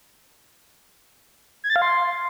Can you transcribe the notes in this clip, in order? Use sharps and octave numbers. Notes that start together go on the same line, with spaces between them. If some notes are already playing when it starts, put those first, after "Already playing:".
G#6
A6
F5
C6